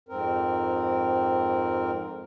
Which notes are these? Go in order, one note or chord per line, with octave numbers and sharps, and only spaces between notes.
F2 G#2 C4 A#4